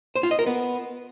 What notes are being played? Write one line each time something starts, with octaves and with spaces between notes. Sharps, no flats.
C5
F4
D#5
A#4
B3